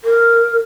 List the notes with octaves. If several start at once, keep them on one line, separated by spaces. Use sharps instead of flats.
A#4